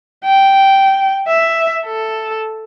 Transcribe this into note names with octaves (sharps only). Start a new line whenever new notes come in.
G5
E5
A4